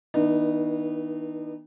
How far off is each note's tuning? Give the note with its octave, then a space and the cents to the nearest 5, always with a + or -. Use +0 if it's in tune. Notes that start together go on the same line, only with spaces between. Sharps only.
D#3 +45 B3 -25 D#4 -45